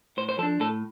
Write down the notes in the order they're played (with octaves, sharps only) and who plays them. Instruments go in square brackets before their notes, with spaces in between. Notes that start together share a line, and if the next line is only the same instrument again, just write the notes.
[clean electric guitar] A2 C5
C5
F3 A4
D4
A2 A4